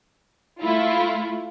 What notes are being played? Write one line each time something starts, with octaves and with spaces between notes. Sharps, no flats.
A3 E4 F4